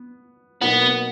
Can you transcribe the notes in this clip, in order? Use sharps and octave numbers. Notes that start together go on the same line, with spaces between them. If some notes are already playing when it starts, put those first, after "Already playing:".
Already playing: B3
B2 F#3 A#3 B3 D#4